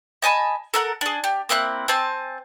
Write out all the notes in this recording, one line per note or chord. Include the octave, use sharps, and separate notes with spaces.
D#5 G#5 A5 B5
A4 A#4 F#5
D4 G#4
G4
A#3 C4 E4 F#6
C4 G#5 A5